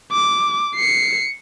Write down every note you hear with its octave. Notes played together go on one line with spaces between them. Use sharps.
D6
C7 C#7